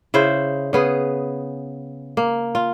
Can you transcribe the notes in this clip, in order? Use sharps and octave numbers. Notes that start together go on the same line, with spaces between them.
C#3 E4 C5
C#3 B3 G#4
A#3
F4